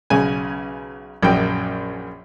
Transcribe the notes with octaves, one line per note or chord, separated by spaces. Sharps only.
B1 C#3 G#5
A#1 F#2 G5